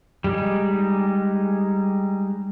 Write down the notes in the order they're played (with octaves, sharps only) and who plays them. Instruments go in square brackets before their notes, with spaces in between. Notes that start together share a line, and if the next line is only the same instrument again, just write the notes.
[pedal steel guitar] G3 G#3 D#4